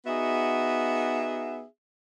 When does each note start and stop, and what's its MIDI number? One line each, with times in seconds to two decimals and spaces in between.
0.06 1.63 59
0.06 1.63 63
0.06 1.63 66
0.06 1.63 68
0.06 1.63 76